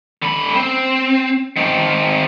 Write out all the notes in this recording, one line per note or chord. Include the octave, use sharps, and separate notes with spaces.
D3 B5
C4
D#3 C4